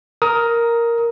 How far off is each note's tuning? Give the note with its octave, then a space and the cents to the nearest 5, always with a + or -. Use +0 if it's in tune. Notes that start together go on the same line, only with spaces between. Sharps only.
A#4 +0 D#6 +25